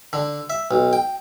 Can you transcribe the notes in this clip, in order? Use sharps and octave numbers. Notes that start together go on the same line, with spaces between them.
D3
E5
B1
G5